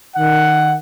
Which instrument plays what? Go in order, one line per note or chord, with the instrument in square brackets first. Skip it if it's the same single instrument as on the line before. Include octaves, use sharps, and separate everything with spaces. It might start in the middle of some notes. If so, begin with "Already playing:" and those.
[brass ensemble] D#3 F#5